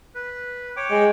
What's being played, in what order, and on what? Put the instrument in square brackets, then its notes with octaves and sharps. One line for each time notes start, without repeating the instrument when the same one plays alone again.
[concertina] B4
C#5 G5 D6
[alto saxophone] G#3